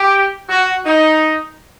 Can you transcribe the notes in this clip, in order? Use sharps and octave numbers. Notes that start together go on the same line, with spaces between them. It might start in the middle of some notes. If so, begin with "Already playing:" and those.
Already playing: G4
F#4
D#4